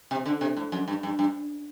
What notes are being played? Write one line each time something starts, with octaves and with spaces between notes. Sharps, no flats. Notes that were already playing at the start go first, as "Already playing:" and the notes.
C3
D3
C3
A2
F#2
G2
G2
G2